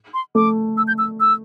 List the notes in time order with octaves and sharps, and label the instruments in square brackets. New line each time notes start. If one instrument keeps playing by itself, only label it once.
[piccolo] C6
[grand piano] A3 [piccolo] D6
[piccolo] E6
G6
E6
E6